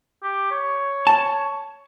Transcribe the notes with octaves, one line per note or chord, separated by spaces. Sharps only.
G4
C#5
A5